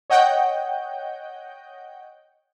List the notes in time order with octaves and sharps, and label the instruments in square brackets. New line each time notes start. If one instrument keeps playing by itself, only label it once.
[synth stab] C#5 D#5 F#5 G5 G6